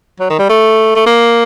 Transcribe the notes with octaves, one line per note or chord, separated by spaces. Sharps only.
F#3
D#3
G3
A3
A3
A#3